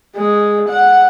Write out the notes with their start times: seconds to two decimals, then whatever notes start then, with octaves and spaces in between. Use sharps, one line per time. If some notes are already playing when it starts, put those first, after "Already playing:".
0.16 G#3
0.69 F#5